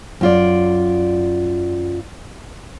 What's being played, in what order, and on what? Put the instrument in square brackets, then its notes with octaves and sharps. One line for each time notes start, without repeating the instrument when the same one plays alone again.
[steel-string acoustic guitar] F#2 F4 D5